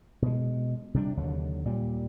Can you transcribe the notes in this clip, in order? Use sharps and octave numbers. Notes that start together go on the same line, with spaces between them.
B2 G#3
C3 G3 D4
D#2 D3 F#3
A#2 G3